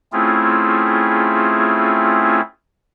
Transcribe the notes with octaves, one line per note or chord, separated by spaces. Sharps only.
A3 C4 C#4 E4 F4 G#4